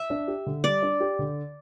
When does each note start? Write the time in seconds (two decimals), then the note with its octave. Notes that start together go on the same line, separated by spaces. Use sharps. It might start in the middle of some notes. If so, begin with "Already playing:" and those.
Already playing: E5
0.10 D4
0.28 G4
0.46 D3
0.64 G3 D5
0.83 D4
1.00 G4
1.19 D3